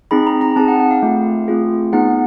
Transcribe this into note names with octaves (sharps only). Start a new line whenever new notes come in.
C4 D#4 G#4 B5
A#5
A#5
C4 D#4 G#4 A5
F#5
F#5
F5
A3 C4 F4 G#4
A3 C4 F4 G#4
B3 D#4 G#4 F#5